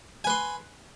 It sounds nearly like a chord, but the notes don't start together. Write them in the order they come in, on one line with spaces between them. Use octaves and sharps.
G#5 B4 C6